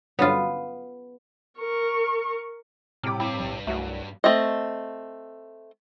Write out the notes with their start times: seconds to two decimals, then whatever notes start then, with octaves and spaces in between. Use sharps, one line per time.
0.19 G2 D3 F#3 B3 F4
1.59 A#4 C#6
3.03 A2 C3 G3 G5 D6 F6
3.20 G2 C4 E4 F5
3.40 B1
3.67 C2 F#3 A3 F#4
4.24 A3 C4 D#5